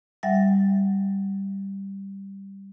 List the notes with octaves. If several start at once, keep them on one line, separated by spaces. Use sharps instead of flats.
G3 E5 F#5 A6